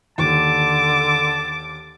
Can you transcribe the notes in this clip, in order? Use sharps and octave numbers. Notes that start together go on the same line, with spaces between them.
D#2 D3 A5 D6